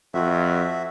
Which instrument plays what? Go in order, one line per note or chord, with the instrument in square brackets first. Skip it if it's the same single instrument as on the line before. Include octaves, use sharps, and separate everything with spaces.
[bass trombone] F2 [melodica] F#4 E5